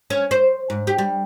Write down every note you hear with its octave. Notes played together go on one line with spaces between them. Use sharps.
C#4
C5
G#2
G4
G3